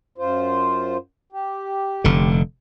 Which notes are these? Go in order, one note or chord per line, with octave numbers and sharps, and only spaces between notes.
F#2 F4 C5
G4
F1 D3